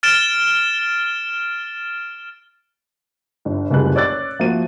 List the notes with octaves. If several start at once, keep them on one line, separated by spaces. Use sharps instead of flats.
F6 A6 D7 E7 G7
G1 G2
F#1 C#2 G3 G#3 F#6
C#5 D5 E6 F#6 A6
F3 A#3 F#4 E5 D#7